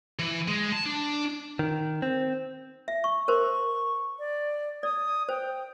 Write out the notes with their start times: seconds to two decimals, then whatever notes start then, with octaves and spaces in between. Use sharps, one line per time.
0.19 E3
0.48 G#3
0.72 A5
0.86 D4
1.59 D#3
2.02 C4
2.88 E5
3.04 C#6
3.28 A#4 C5 C6 C#6
4.19 D5
4.83 D5 D#6
5.29 C5 G5